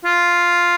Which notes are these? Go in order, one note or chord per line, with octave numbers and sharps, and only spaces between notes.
F4